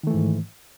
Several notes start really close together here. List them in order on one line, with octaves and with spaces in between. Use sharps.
D#3 A3 E3 G#2